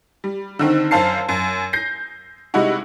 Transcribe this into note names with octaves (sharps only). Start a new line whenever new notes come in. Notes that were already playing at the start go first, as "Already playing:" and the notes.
G3
D3 D#3 C4
F#2 C5 F5 A5 C7
F#2
G6 A#6 C7
C3 G3 G#3 D#4 E4 F#4